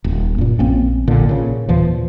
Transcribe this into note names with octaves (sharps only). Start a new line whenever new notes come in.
D#1
F#2 A#2
A#1 A#3 C4 C#4
A#1 A#2 D3
A#2 C#3
D#2 A#2 E3 F3